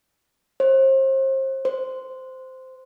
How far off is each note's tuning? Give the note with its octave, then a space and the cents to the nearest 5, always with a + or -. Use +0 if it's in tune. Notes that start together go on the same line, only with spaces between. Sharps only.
C5 +35
C5 -10